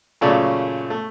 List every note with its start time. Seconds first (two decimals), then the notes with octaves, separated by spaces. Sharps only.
0.21 F#2 A#2 C#3 A3 C#5 D5
0.90 A3